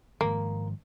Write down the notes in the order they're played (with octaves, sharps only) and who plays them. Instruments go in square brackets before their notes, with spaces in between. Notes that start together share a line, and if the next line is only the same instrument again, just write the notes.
[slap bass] G#2 D#3 F3 [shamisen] A#3